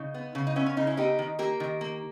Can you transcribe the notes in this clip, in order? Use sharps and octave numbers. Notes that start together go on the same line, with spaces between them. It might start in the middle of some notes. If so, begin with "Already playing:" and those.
Already playing: C#3 D#4
B3
C#3
D#4
B3 C#4 E4
C#4
C#3 D#4
C#4 E4
B3 D#4 G4
D#3
A#3 G4 A#4
D#3
A#3